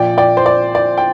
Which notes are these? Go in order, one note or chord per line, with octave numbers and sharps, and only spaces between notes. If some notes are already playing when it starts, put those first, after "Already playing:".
Already playing: A#1 A#2 F3 D5 G5
D5 G5
C5
D5
D5
G5